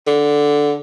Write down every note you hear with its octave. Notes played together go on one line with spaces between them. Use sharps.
D3